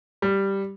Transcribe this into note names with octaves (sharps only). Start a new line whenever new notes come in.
G3